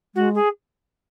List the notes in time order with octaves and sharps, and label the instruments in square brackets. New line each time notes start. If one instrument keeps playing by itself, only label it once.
[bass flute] G#3 [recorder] F#4
[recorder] G#4